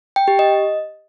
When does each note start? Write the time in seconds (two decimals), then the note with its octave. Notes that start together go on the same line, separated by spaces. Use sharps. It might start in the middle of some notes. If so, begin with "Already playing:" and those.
0.16 G5
0.28 G4
0.39 D#5